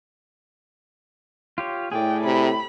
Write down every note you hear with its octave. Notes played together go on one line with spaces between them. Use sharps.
F4 G4 C#5
A2 G#4 D5 G5
C3 B5